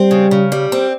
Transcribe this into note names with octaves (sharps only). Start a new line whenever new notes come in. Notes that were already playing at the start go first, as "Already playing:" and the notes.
Already playing: G3 C4
C#3
C#3
G3
C4